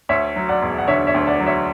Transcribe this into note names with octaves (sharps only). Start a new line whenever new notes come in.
D2 C#5 E5
F#3
D5 F#5
E1
F#5
D3 C#5 E5
C#5 E5
D2
D5 F#5
F#3
C#5 E5